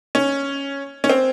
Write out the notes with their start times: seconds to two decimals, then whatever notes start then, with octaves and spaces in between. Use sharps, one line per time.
0.15 C#4
1.04 C#4
1.10 C4